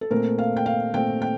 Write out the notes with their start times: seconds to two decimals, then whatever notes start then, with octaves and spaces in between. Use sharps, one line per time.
0.01 A4
0.11 A#2 A3 C4 A#4
0.38 F5
0.57 G5
0.66 F5
0.94 A#2 A3 C4 G5
1.22 G5